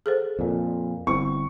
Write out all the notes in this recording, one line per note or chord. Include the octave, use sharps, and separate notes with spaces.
G#4 A4 C5
F2 A#2
G1 C4 E4 C#6